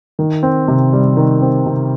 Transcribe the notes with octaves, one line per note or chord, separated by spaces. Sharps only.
D#3
C4
C3
G3
D#3
C4
C3